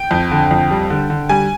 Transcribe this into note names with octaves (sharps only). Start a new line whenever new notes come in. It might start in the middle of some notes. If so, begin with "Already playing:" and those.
Already playing: G5
F2
D3
F2
G3
D3
D3
G3 G#5